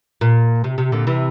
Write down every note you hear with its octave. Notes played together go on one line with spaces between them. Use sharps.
A#2
C3
C3
A#2 D3
C3 E3